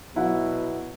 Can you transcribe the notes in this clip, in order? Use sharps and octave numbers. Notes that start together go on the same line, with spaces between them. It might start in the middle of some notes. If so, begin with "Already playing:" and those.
B2 F#3 E4 F#5